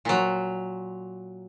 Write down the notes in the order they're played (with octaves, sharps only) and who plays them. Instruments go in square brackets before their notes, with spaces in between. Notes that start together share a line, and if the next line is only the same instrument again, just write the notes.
[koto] A#2 F#3